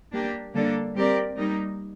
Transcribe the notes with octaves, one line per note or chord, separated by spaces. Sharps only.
G3 A#3 D4 G4
D3 G3 A#3 D4 A4
G3 C4 G4 A#4 D5
G3 A#3 D#4